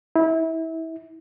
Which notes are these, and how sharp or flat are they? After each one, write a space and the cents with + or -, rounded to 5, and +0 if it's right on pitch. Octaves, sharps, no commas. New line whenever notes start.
E4 -25